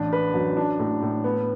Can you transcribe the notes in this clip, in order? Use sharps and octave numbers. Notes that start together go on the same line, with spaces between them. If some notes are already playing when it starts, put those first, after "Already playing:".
Already playing: A1 D4
B4
F#2
D4
A2
A2
B3